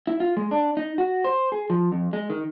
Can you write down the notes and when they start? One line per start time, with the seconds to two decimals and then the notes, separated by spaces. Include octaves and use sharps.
0.07 E4
0.20 F4
0.37 G#3
0.51 D4
0.77 D#4
0.98 F#4
1.24 C5
1.52 G#4
1.70 F3
1.92 F2
2.13 G#3
2.30 D#3